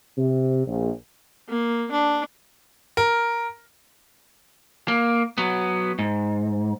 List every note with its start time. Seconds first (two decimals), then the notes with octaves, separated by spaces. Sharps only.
0.18 C3
0.67 A#1
1.49 A#3
1.91 D4
2.97 A#4
4.88 A#3
5.38 F#3 B3
5.99 G#2